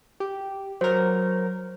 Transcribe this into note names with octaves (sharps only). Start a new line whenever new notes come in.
G4
F#3 A#4 C5